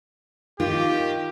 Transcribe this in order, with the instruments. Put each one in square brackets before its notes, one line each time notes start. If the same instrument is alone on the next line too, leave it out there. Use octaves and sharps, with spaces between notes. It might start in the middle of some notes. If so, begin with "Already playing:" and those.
[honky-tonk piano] D#3 [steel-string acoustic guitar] F4 [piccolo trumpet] G4